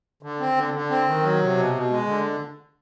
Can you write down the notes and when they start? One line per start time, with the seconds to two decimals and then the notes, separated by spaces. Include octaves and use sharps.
0.23 D3
0.40 C4
0.56 D3
0.74 D3
0.90 C4
1.06 D#3
1.23 F#3
1.41 C3
1.57 B2
1.73 B2
1.91 G#3
2.07 D3